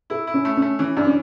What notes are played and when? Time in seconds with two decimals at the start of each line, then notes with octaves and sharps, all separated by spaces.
0.10 E4 A4
0.27 E4
0.34 C#4
0.45 A3
0.57 C#4
0.62 A3
0.79 E3 C#4
0.97 F#2 D4
1.06 C#4